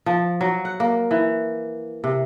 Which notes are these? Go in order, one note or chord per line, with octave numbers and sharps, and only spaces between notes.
F3
F#3
F#5
A#3
E3
C3